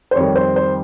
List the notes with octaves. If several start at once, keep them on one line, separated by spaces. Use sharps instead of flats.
C5
F2 D#3 G3 C#5
C5
C5